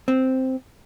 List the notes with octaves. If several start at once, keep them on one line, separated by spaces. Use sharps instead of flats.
C4